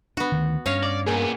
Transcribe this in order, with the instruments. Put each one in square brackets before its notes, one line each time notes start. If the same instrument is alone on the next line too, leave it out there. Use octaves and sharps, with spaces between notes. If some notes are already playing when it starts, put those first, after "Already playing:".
[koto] B3 F#4 [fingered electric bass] D4
[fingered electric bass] D2 D#3
[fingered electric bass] G2 [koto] C#4 C#5 F5 [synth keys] F6 A#6
[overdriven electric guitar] D5
[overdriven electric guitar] A#2 B3 [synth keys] G#4 A#4 G#5